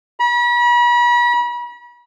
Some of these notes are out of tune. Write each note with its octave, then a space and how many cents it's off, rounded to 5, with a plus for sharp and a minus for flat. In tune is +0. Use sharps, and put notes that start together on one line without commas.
B5 -40